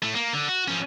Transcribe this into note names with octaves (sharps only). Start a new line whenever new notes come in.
A2 A3
A#3
D3
F#4
F3 C#4